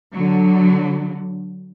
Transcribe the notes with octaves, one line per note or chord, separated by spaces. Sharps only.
D3 F#3